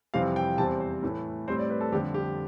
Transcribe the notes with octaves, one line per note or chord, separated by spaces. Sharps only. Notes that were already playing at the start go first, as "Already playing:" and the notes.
F2 C3 E3 G3 C4 F5
G5
E2 C3 G3 C4 A5
C5
A2 E3 A3
A2 G3 C4 C5
D5
B4
A4
F2 D3 G3 G4
G4